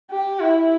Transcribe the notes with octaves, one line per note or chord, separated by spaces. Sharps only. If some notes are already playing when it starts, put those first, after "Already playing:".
G4
E4